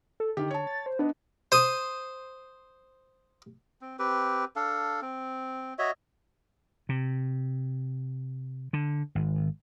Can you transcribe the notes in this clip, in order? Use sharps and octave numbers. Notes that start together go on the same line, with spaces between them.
A4
D3 D#3 G4
C#5 A5
A6
C5
B3 D4 D#4
C5 D#6
C4
C4 G4 B4
D4 A4 F5
C4
F#4 C#5 D#5 E5
C3
D3
G#1